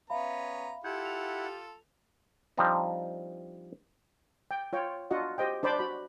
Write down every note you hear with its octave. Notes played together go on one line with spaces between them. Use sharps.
B3 C#4 E5 F5 A#5 B5
E4 F4 G4 A4 F#5 G6 G#6
F7
F3 G3 C4 D4 D#4
G5
F4 C#5 G5
D4 F4 F#4 D#5 F#5
G4 C5 D#5 G5
D4 C5 D5 B5 D6
F#4 B5